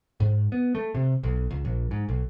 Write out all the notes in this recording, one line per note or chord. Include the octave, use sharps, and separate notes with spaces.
G#2
B3
A3
C3
B1
C#2
A#1
G#2
B1